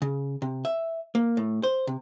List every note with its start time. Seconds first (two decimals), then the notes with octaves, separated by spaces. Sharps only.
0.02 C#3
0.42 C3
0.65 E5
1.15 A#3
1.37 A2
1.63 C5
1.87 C3